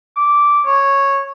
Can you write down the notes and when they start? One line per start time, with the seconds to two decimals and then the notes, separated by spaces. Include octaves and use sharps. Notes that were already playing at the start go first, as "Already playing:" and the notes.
0.16 D6
0.66 C#5